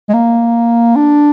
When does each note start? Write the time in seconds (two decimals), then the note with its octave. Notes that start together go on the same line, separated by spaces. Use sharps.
0.09 G#3
0.14 A#3
0.96 D4